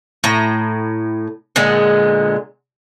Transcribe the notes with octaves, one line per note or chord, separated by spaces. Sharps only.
A2 A#5
A#2 D3 G#3 B3